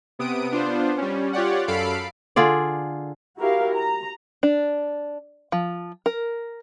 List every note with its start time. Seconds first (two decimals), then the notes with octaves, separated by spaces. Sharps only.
0.19 C3 B3 D#6 D7
0.51 B3 D4 F4 C5
0.98 G3 C#4
1.33 F4 G4 C#5 D5 F#5
1.68 F#2 A4 F5 B5 C7 D7
2.36 D3 F4 G#4 D5
3.38 E4 F#4 G4 A#4 F5
3.73 A#5
4.43 D4
5.52 F3
6.06 A#4